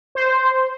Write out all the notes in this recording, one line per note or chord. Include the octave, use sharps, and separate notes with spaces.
C5